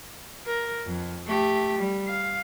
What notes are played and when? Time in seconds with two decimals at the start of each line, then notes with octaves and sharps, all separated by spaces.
0.46 A#4
0.86 F2
1.27 A3 G4
1.79 G3
2.08 F5